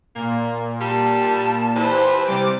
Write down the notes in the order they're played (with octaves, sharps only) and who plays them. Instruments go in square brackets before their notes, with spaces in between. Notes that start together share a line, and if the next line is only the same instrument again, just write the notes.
[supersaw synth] A#2 [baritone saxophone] A#3
[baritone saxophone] G3 [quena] A5
[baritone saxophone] E3 [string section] G4 C5 B5
[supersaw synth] C3 G3 D6